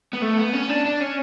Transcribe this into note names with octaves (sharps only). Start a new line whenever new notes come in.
B3
A3
B3
C#4
D4
D4
C#4